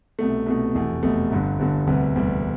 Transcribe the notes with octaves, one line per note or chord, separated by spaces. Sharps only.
C2 B2 A3
C2 B2 A3
F1 E2 B2 A3
F1 E2 B2 A3
G1 G2 D3
G1 G2 D3
E1 D2 C3 G3 B3
E1 D2 C3 G3 B3